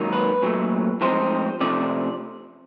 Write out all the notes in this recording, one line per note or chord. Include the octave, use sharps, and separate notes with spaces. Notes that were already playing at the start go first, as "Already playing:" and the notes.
Already playing: G#2 D#3 F#3 A#3 D#4
B4
A#2 F#3 A3
A2 F3 G#3 C4 D#4 C5
C3 F3 A3 D4 D5